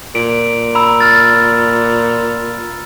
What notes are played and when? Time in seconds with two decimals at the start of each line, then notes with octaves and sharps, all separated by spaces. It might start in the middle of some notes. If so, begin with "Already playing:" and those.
0.15 A#2 D7
0.75 A#5 B5 E6
1.00 F6 A6